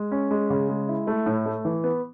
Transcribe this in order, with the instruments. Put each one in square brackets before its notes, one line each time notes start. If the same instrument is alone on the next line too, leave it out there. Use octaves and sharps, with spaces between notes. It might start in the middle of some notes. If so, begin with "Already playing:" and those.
Already playing: [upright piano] G#3
C#4
G#3
C#3
G#3
E4
A3
A2
A3
E3
B3